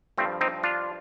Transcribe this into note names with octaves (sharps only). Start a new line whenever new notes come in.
G2 F3 A3 C4
C4 D#4
D4 F4